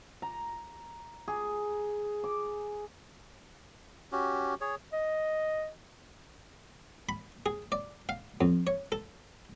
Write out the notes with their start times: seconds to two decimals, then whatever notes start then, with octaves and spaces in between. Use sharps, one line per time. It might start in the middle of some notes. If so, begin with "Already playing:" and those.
0.22 A#5
1.28 G#4
2.24 D6
4.12 C#4 F#4 G4
4.61 G#4 C#5
4.93 D#5
7.09 B5
7.46 G#4
7.72 D5
8.09 F5
8.41 F2
8.67 C#5
8.92 A4